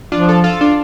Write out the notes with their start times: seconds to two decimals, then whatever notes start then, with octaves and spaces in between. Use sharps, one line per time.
0.12 F3 D4 F4
0.28 F4 A4
0.44 F4 A4
0.61 D4 F4